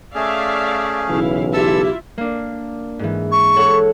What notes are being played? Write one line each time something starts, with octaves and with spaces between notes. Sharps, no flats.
A3 C#4 G#4 D5 E5 F5
B1 C#3 E3 E4 F5
E4 F4 G4 A4 E5 E6
A#3 D4
G#2 E3
C#6
A4 C#5 F#5